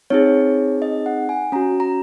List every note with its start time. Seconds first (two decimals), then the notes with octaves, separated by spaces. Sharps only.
0.10 C4 D#4 G#4 C#5
0.82 D#5
1.06 F#5
1.29 G#5
1.52 C#4 F#4 A#5
1.80 A#5